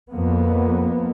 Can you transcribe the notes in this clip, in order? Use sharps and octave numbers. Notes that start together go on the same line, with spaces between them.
F2 A#3 B3